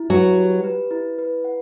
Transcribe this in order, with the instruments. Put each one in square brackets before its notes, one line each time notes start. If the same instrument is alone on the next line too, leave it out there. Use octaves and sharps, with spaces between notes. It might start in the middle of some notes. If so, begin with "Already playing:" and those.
Already playing: [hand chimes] E4
[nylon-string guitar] F#3 F#4 [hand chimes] B4
[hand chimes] G4
B4
E4
B4
F#5